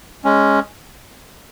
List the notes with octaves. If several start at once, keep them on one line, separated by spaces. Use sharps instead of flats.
G#3 C#4